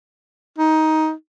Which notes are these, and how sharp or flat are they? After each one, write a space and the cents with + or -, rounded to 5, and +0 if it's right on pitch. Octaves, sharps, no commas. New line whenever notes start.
D#4 +15